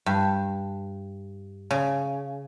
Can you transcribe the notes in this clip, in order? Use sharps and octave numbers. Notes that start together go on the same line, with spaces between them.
G2
C#3